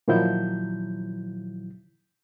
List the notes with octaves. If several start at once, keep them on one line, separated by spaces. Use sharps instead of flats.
A#2 D#3 F3 F#3 E4 G6